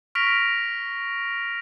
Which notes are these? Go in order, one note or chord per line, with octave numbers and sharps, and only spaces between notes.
C#6 F6 A#6 B6 D7 F7